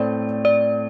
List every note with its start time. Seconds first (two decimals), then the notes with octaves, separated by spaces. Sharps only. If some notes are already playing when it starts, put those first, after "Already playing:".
Already playing: A2 A3 C4 D5
0.45 D5